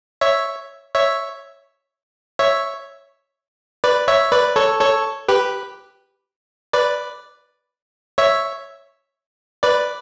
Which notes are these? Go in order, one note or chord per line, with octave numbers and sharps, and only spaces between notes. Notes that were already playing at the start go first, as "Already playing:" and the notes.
C#5 E5
C#5 E5
C#5 E5
B4 D5
C#5 E5
B4 D5
A4 C#5
A4 C#5
G4 B4
B4 D5
C#5 E5
B4 D5